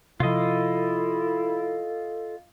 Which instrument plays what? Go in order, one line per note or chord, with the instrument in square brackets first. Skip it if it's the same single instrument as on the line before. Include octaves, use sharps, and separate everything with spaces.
[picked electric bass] C3 F3 [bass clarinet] E4 [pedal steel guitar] F4 D#5 [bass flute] A4